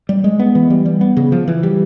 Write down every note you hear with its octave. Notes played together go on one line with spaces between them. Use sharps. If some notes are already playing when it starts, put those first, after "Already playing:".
G3
G#3
B3
E3
G3
G3
B3
C#3
F3
E3
G3